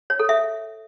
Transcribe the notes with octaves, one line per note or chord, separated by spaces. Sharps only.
C#5
A4
E5